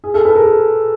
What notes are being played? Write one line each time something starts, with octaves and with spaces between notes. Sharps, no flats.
G#4
A4
A4 B4
G#4 A#4
G#4